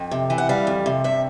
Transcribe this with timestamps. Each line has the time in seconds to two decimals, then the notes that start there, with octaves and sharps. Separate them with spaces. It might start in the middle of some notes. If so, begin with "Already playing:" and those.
Already playing: F2 G5
0.11 C3
0.30 E3
0.38 F#5
0.49 G3 F5
0.67 F2
0.86 C3
1.04 G2 E5